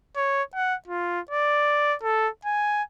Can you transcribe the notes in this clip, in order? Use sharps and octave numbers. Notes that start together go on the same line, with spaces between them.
C#5
F#5
F4
D5
A4
G#5